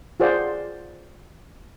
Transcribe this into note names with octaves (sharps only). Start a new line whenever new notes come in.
F4 G#4 C5 D5 F#5